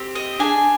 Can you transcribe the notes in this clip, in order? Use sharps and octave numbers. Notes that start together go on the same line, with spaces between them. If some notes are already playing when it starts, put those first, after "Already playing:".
Already playing: C4 G4
D#5
D4 G#4 G#5